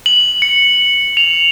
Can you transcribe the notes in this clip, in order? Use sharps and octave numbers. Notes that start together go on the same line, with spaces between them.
F#7
C#7
F7